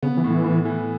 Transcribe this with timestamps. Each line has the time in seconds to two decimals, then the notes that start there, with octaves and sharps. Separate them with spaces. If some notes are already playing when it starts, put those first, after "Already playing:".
0.03 C#3 B3
0.17 E3
0.24 A2
0.30 E3
0.44 A2
0.65 E3